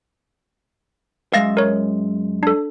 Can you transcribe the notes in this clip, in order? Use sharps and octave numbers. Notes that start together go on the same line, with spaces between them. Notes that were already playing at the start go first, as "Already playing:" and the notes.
F#2 G#3 E5 F5 A6 A#6
A#4 C#5
D4 A4